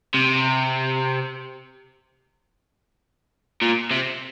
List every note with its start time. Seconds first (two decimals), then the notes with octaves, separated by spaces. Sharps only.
0.14 C3
3.62 A#2
3.91 C3